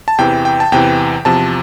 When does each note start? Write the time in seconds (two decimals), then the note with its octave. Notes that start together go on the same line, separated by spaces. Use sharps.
0.08 A5
0.18 E2 C3 E3 G5
0.45 G5
0.60 A5
0.72 E2 C3 E3 G5
1.25 E2 C3 F3 A5